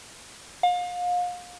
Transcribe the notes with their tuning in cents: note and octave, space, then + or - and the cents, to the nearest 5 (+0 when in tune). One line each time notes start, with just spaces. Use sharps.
F5 +35